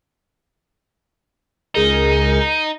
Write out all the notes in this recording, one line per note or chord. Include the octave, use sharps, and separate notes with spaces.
C#2 D#4 G#4 A#4